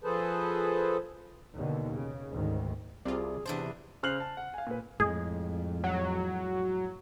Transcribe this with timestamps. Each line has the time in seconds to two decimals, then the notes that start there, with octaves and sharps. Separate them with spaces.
0.04 F3 G#4 A4 B4 C5 A5
1.54 D#2 B2 D3 D#3
1.91 C#3
2.31 D2 G#2 D#3
3.05 C2 C3 C4 F4 G#4 D5
3.46 E2 C3 D4 C5 A5
4.03 C#3 C5 F6 F#6 C7 F#7
4.20 A5
4.37 F#5
4.54 F5 G#5
4.67 A#2 B4
5.00 F2 A2 G#3 G#4
5.84 F#3